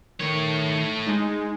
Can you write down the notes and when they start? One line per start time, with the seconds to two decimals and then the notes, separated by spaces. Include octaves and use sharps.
0.20 D#3 A3 C#5
1.07 G#3 D#4